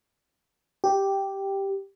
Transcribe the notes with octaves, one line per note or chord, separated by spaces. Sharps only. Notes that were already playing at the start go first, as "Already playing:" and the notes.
G4